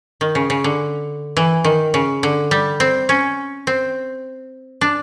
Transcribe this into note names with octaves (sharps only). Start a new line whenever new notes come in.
D#3
C#3
C#3
D3
E3
D#3
C#3
D3
G3
C4
C#4
C4
D4